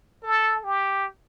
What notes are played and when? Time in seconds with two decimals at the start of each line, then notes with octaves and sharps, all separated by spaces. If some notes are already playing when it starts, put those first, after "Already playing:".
0.23 A4
0.64 G4